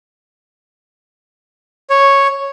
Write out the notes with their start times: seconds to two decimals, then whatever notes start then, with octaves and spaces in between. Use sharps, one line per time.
1.90 C#5